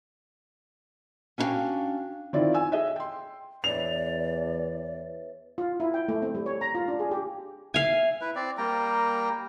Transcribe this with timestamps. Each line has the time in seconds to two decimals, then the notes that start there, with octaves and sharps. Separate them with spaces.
1.38 C#4 D4 E4 F#4 F5 G5
2.33 D#3 C4 E4 F4 D5
2.54 G#5 E6
2.72 G#4 D#5 E5
2.96 G5 C6
3.64 E2 B4 C#5 D5 E5 F7
5.58 F4
5.80 E4
5.94 G5
6.08 A3
6.22 C4
6.35 G3
6.46 C#5
6.61 A#5
6.75 F4
6.88 D4
6.99 G#4
7.11 G4
7.74 E5 F5 G#5
8.21 E4 B4
8.36 C4 D5
8.58 G3 A#3 G5 A#5